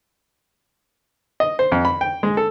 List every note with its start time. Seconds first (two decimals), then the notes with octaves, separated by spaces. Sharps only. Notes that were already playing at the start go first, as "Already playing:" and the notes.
1.40 D#5
1.59 C5
1.72 F2
1.85 B5
2.01 G5
2.23 G#3
2.37 A4